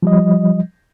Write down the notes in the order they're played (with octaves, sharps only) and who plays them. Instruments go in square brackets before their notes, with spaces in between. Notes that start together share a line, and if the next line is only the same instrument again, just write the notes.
[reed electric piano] F3 G3 D#5